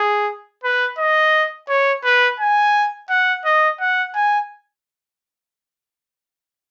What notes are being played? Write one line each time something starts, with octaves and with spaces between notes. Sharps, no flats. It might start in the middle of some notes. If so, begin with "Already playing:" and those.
Already playing: G#4
B4
D#5
C#5
B4
G#5
F#5
D#5
F#5
G#5